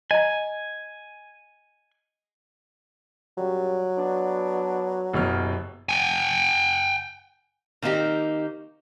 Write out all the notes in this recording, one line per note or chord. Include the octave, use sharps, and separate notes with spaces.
D#5 G#5 A#5
A#2 C#3 F#3 G3
B3 D4
F#1 D#2 B2 F6
G5 G#5
D#3 A#3 C4 D#4 G4